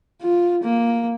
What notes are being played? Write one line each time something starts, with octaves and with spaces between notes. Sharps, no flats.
F4
A#3